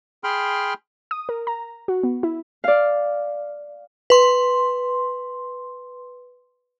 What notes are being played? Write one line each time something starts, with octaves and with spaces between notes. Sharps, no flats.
G#4 G5 B5 C6 F6
D#6
A#4
A#5
F#4
B3
E4
D5 F5
B4 C6